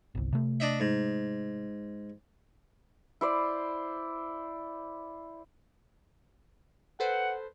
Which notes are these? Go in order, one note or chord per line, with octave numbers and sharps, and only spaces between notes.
G1 C2
C3 A3
D4 D#5 E5
G#2
E4 C5 D5
A4 B4 C5 F#5